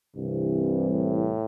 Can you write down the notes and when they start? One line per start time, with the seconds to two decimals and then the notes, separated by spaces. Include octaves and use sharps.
0.15 C2 G2 C3 E3
0.91 A2